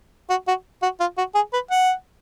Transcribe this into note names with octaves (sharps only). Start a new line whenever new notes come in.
F#4
F#4
F#4
F4
F#4
G#4
B4
F#5